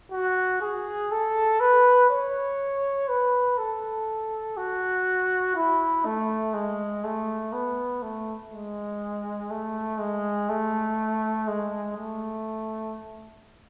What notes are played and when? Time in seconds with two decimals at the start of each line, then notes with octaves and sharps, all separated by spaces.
0.12 F#4
0.62 G#4
1.11 A4
1.61 B4
2.10 C#5
3.08 B4
3.58 A4
4.57 F#4
5.56 E4
6.05 A3
6.54 G#3
7.04 A3
7.53 B3
8.02 A3
8.52 G#3
9.51 A3
10.00 G#3
10.49 A3
11.48 G#3
11.97 A3